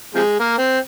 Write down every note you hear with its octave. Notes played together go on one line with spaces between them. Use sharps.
C3 F3 G#3
A#3
C4